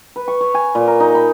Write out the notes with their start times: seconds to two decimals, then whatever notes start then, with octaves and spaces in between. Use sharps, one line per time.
0.16 B4
0.28 C#6
0.41 C#5
0.54 G#5
0.75 A#2
0.87 A#4
1.00 D#4
1.15 B5